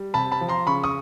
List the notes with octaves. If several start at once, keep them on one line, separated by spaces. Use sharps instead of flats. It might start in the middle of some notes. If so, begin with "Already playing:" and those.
Already playing: G3
C3 A5 B5
A5 B5
F3
A#5 C6
C#3 B5 C#6
C#6 D#6